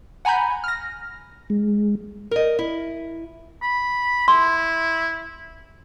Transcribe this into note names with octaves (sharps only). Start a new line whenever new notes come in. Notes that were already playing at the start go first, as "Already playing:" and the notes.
F#5 G#5 A#5 B5 G6
F6 A#6
G#3
A#4 D#5
E4
B5
E4 C6